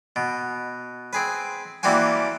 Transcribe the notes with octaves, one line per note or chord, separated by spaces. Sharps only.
B2
C4 G#4 B4
E3 G3 A#3 C4 F#4 G#5